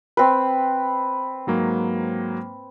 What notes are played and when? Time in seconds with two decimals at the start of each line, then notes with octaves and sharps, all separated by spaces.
0.17 C4 B4
1.47 G#2 F#3 A#3